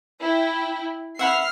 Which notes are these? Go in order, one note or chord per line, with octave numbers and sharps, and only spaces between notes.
E4 G5
E5 F#5 B5 F6 C7